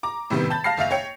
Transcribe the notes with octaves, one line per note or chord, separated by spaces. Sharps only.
A#5 D6
A2 C3 D#3 G3 B3
A5 B5 G6 A6
F5 A5 F6 A#6 C7
F#1 E5 F5 F7
C#5 G5 C#7